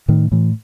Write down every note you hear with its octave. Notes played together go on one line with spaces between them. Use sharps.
A2 D#3
A2 E3